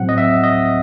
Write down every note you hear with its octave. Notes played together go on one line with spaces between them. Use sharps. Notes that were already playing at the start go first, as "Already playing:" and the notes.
Already playing: A2 F#3 C4 F#5
D#5
E5
D#5